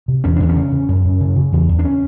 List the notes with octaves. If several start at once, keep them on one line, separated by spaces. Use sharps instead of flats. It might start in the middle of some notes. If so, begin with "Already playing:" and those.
C3
E2 C#4
E2 D4
C#4
C#3
C#3
F#2
F#2
C#3
C#3
E2
E2
D4
C#4